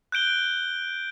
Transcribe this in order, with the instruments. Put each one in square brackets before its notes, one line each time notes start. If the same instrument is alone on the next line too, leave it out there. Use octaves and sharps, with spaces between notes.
[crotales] F#6 G6 D7 G7